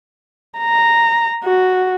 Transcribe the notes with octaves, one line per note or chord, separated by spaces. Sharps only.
A#5
F#4